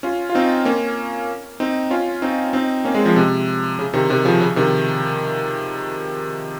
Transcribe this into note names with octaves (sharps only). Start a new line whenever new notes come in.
C#4 F4
F4
C4 D#4
A#3 C#4
C4 D#4
C#4 F4
C4 D#4
C4 D#4
A#3 C#4
G#3 C4
F3 G#3
C3
C#3
C3 D#3
C3 D#3
C#3 F3
C#3
C3 D#3